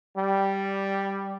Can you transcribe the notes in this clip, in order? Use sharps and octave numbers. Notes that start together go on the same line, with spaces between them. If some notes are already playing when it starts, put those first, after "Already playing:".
G3